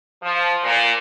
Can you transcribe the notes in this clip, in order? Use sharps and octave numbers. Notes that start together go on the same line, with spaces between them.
F3
A#2